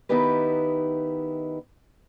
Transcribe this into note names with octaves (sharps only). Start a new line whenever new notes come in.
D#3 B3 D#4 E4 G4 B4